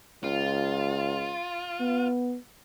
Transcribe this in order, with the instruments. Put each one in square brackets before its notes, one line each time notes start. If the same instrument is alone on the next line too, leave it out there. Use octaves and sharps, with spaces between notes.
[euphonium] C#2 [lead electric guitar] F4
[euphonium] B3